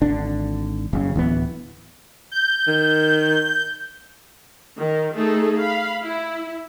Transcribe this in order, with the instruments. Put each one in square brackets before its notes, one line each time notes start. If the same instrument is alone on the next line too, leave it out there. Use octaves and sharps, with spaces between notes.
[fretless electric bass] G#1 D3 D4
F#1 C#3
D1 E3 B3
[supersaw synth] G6
[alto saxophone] D#3
[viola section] D#3
A3 D#4 G#4 A4
F5 B5
E4